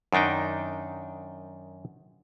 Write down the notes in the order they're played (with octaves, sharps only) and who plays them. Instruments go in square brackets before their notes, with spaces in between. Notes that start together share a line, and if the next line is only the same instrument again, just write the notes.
[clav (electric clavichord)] F#2 D#3 D4 D#4 G5